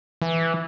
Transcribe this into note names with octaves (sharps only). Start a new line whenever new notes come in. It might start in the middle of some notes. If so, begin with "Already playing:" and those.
E3